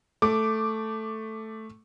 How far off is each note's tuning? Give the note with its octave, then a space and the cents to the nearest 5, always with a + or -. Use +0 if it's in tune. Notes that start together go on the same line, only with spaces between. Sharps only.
A3 +0 D6 +0